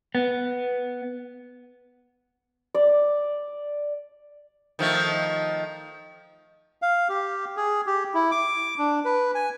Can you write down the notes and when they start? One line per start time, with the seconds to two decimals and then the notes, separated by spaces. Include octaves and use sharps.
0.15 B3
2.75 D5
4.79 D#3 F3 A3
6.82 F5
7.09 G4
7.57 G#4
7.87 G4
8.14 E4
8.31 D6
8.78 D4
9.05 B4
9.35 G#5